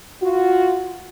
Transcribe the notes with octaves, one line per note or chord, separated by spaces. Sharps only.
F4 F#4